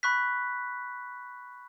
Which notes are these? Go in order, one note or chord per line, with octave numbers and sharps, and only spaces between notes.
B5 C#6 F#6 B6